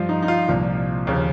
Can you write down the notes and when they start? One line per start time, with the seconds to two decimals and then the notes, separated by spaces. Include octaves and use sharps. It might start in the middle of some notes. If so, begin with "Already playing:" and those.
Already playing: G2 F3 F4
0.09 D#4
0.22 D#4
0.28 F4
0.48 C2 A#2 F3
1.07 D#2 C#3 F3